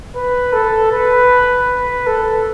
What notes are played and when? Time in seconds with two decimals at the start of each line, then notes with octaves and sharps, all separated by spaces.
0.15 B4
0.53 A4
0.92 B4
1.69 B4
2.07 A4